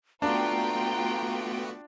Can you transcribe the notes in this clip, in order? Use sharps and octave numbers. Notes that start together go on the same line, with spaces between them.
A3 B3 D4 F4 F#4 G5 A#5